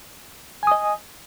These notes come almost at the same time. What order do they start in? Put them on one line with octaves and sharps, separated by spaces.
G#5 D#6 D#5